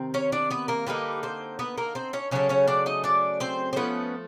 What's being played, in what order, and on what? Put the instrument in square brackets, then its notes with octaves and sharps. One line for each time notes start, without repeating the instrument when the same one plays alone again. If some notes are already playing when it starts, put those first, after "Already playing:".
Already playing: [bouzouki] C3 D#3 C4
C#4 C#5
D4 D5
B3 B4
A#3 A#4
D3 G3 A#3 D#4 B4
C4 C5
B3 B4
A#3 A#4
C4 C5
C#4 C#5
C#3 F#3 A3 C#4 D4 C#5
C#4 C#5
D4 D5
D#4 D#5
D4 D5
C4 C5
C5
F3 A3 B3 C#4 B4